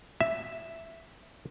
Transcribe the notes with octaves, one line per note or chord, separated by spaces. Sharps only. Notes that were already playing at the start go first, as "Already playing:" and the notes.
E5